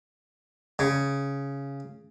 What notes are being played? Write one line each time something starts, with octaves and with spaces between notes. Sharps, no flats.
C#3